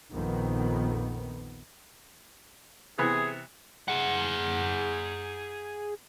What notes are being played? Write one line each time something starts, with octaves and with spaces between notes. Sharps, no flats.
A#1 F2 D#3 B3
C3 E3 B3 G#4
G#4 F#5